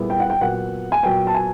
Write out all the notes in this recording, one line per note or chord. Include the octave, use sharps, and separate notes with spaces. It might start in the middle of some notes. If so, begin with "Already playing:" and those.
Already playing: A#2 G3 B3 E4 G#4
G5
F#5
G5
A#2 F#3 B3 F#5
G#5
A#2 F#3 B3 G5
A5
G#5